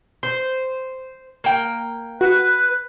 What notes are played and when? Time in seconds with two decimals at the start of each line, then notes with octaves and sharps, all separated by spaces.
0.23 C5
1.44 A#3 G5
2.21 F#4 B4